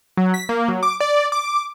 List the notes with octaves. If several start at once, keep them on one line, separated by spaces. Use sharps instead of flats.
F#3
B6
A#3
F#3
D6
D5
D6